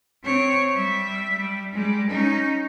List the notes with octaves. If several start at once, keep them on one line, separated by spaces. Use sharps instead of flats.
C4 C#5
G3 E5
G3
G3 G#3
C#4 D#4